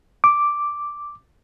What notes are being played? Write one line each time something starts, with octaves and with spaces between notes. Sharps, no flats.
D6